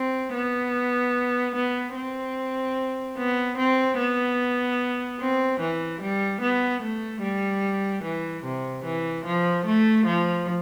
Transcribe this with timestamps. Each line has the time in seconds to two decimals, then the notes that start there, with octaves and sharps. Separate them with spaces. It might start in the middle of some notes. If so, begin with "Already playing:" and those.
Already playing: C4
0.34 B3
1.55 B3
1.95 C4
3.18 B3
3.58 C4
3.98 B3
5.20 C4
5.60 E3
6.01 G3
6.41 B3
6.82 A3
7.22 G3
8.03 E3
8.44 C3
8.84 E3
9.25 F3
9.65 A3
10.06 F3